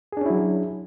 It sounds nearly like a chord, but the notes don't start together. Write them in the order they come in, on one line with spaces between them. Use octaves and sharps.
G#4 D4 C#4 E4 F#3